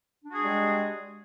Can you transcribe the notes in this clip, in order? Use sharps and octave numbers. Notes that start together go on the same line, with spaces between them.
G3 G#3 D4 F#4 G#4